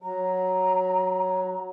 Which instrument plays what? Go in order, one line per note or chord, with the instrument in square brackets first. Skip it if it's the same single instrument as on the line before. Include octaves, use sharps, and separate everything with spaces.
[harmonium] F#3 [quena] A#5